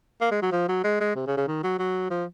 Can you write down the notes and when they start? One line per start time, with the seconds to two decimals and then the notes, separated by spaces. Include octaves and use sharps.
0.21 A#3
0.31 G#3
0.42 F#3
0.52 F3
0.68 F#3
0.84 G#3
1.00 G#3
1.15 C3
1.27 C#3
1.37 C#3
1.47 D#3
1.63 F#3
1.79 F#3
2.10 F3